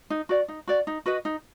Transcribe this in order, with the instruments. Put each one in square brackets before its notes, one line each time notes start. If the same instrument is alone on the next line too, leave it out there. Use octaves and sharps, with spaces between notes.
[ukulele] D#4
F#4 D5
D#4
F#4 D5
D#4
F#4 B4 D#5
D#4